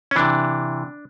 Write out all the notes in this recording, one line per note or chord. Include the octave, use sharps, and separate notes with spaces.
C#4
C3 E3 D4